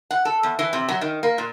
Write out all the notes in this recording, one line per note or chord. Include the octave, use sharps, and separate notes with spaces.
F#5
A4
E2
E3
C3
F#3
D#3
A#3
A#2